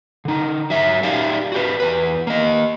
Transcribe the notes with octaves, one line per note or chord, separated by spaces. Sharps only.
D3 D#4
F#3 E5
D#4 G4 D5 E5 F5
F#4 G4 B4
E2 B4
A#3 D#5